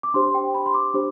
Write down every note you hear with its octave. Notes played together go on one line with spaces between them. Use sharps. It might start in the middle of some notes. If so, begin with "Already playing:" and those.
D6
D4 G4 C5 C6
G5
B5
C6
D6
D4 G4 C5